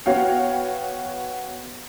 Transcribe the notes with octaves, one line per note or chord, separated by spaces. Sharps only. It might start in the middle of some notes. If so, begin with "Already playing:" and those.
B3 F#4 C#5 F5 G5